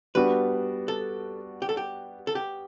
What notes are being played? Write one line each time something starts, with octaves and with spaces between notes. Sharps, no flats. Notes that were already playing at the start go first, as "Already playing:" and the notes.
G3 B3 D4 F#4 B4
A4
G4
A4
G4
A4
G4